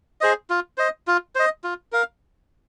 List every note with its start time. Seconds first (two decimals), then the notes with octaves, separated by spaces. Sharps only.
0.21 G#4 C5 D#5
0.50 F4
0.78 C5 D#5
1.07 F4
1.35 C5 D#5
1.64 F4
1.92 A#4 F5